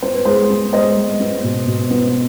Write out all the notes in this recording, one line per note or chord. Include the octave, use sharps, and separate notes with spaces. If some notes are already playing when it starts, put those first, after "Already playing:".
B3 C5
B4
G#3 G#4 C5
B3
G#3 C5 D#5
G#3
B3
B2
B2
B3